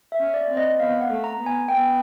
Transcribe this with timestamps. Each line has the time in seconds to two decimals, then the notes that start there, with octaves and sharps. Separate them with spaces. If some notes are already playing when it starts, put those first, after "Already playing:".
0.12 E5
0.20 C#4
0.34 D5
0.50 C4
0.57 D#5
0.79 B3 F5
1.01 F#5
1.09 A3
1.24 A#5
1.39 B3
1.46 G#5
1.69 B3 G5